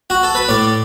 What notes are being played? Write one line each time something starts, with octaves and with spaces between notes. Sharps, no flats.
F#4
A4
B4
A2 D5